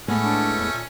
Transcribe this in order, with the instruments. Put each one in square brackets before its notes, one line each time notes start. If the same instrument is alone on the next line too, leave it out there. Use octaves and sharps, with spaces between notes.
[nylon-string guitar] A2 G#3 B3 [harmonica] A3 C#4
[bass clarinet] D4
E2
A#2